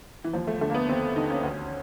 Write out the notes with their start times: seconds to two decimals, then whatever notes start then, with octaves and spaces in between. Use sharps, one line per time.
0.24 E3
0.33 D#2 F3
0.47 A3
0.61 D3 A3
0.70 A#3
0.75 B3
0.89 D#2 C4
1.16 D3 D#4
1.30 C#4
1.43 D2